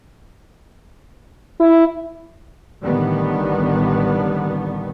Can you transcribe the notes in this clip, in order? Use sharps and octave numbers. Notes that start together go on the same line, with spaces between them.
E4
A1 D3 D#3 G3 B3